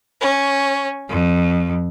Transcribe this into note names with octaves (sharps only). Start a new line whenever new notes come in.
C#4
F2